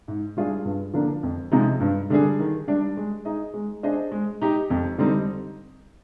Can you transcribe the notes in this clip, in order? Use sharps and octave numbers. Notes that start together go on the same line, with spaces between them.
G#2
G3 D4 F4 G#4
G2
D3 F3 A#3 D4
F2
C3 F3 G#3 D#4
G2
D3 G3 D4 G#4
D#3
G3 D4
G#3
D#4 G#4 D#5
G#3
D4 G#4 C5 D#5
G#3
D#4 G4
F2
D3 G3 C4 D#4